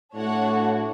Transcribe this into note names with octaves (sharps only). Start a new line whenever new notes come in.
A2 D4 F#4 A4 C#5 F#5